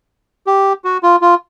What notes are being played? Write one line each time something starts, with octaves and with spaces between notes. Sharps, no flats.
G4
F#4
F4
F4